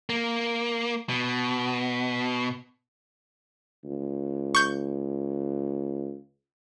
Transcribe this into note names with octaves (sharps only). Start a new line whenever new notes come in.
A#3
B2
C#2
C#6 G6